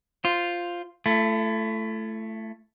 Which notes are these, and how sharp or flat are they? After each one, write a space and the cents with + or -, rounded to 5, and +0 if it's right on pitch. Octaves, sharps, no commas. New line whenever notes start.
F4 +0 C5 +0
A3 +0 E4 +40